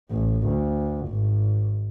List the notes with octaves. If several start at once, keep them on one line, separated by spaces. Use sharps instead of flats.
A1
D2
G#1